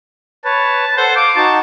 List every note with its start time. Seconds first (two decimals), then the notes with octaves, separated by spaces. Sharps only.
0.45 B4 C#5 A5
0.97 A4 C5 F#5
1.16 F5 D6
1.36 D#4 F#4 A5